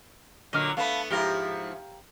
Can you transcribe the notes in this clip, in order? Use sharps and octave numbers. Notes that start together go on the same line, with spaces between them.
A#2 D3 F#3 D#5 D6 F6
A3 B3 F5 A5 B5
G#2 F3 E4 G4 F5 A#5